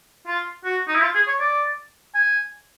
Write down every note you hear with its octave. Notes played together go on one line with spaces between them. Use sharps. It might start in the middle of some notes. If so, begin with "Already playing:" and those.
F4
F#4
D#4
E4
F4
G#4
C#5
D5
G#5